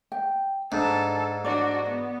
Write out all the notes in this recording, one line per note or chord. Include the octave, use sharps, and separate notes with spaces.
G5
G#2 D4 A4 A5
D4 F#4 D5
B3